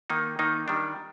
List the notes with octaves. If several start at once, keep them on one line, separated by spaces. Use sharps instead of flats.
D#3 A#3 D#4
D#3 A#3 D#4
D#3 G3 D4